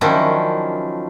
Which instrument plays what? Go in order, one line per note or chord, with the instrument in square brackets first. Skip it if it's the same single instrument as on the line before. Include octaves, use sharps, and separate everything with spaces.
[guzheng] D#3 F3 F#3 C#4 D4 E4